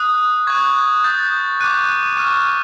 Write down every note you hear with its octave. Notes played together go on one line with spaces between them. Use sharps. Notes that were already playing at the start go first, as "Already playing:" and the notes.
Already playing: D#6 F#6
C#6 F#6 G#6
D#6 G6 A6
D6 F#6 D#7
C#6 F6 D#7